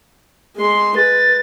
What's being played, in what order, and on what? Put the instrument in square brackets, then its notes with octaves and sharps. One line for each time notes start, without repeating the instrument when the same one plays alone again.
[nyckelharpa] G#3 C6
[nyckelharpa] B4 [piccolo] A6